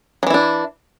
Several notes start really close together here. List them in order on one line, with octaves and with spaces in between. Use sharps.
F#3 E3 E4 D4